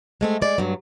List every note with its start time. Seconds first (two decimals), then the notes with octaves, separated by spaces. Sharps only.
0.21 G#3 A3 C4
0.42 G#3 D5
0.58 G2 F#3